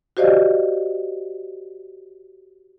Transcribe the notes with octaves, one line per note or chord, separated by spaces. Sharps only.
F#4 G4 C5 D5 D#5 F5